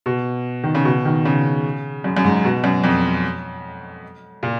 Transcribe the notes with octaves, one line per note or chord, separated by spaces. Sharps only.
B2
D#3
C#3
B2
D#3
C#3
F#2
F#2
G#2
B2
F#2
F2
A#2